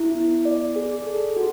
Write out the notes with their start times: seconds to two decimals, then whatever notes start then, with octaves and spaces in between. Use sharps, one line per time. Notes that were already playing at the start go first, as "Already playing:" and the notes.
Already playing: E4
0.15 B3
0.45 D5
0.76 G#4
1.07 A4
1.36 F#4